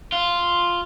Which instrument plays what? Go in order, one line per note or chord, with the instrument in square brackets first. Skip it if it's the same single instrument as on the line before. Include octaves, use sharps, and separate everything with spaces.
[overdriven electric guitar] F4